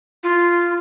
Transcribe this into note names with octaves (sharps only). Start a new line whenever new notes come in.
F4